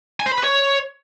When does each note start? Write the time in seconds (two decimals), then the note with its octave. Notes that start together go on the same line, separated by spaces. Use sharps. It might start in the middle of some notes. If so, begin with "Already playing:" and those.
0.20 G#5
0.26 C5
0.32 B5
0.38 B4
0.44 C#5